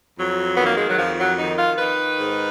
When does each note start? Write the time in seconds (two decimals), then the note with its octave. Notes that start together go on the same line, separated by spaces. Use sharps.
0.18 F2 F#3
0.57 D#3 B3
0.66 A#3
0.77 G#3
0.88 F#3
0.99 F2 F3
1.19 F#3
1.38 D#3 D#4
1.58 F4
1.79 D#3 B4
2.19 G#2